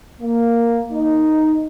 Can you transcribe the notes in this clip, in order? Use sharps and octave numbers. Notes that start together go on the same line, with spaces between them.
A#3
D#4